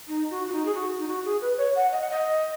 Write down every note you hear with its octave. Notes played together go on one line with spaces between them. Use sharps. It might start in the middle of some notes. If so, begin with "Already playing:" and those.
D#4
F#4
F#4
D#4
G#4
F#4
D#4
F#4
G#4
B4
C#5
F#5
D#5
F#5
D#5